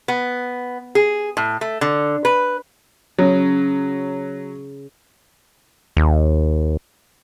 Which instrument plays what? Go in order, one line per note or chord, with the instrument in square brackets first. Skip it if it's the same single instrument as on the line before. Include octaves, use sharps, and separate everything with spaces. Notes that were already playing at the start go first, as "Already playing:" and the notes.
[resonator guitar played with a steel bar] B3
G#4
A2
A3
D3
B4
[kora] C#3 [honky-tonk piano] F#3
[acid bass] D#2